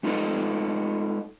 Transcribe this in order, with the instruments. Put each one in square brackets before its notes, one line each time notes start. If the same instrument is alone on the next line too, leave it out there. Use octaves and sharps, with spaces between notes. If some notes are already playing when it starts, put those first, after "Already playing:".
[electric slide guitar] G#3 D#4 F4 A4 B4 D#5